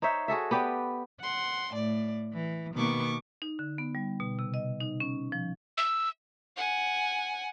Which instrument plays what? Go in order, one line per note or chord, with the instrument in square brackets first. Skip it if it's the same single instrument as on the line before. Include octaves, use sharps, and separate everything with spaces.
[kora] D#4 C5 C#5 E5
F#4 G#4 A4 E5
B3 G4 B4 D5
[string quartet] F#5 C6
A2 D5
E3
B2 D#3 A#3 B3 C#6 D6
[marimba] D#4
D3
B3
G3
B2
C3
D#5
D#4
C#4
F3
[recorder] E6
[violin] F#5 G#5